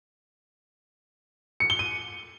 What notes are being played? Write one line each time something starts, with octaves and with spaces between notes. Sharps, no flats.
C#7
G7
D#7